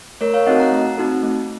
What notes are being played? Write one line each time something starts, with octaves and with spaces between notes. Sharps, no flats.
A3 A#4 C#5
C#5 F5
C4 D#4 F#4 A4 D#5 F#5
F#5 A#5
A3
C4 D#4 F#4 A4
A3